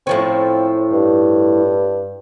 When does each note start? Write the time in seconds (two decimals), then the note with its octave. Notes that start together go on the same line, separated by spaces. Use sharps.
0.07 A2 F3 C4 C#4
0.93 G2